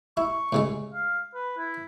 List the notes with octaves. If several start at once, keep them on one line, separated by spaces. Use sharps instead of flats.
E4 C#6
A2 C#3 G#3
F5
B4
E4